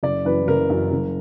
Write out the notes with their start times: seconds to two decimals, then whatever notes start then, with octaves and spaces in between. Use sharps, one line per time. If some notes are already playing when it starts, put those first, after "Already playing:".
0.03 F#1 D5
0.25 F#2 E3 B4
0.47 F#1 A#4
0.70 F#2 E3
0.91 F#1